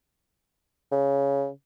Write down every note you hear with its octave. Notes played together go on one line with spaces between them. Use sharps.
C#3